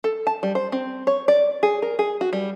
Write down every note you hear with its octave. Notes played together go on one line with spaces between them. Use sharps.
A4
A5
G3
C5
C4
C#5
D5
G#4
A#4
G#4
F#4
G3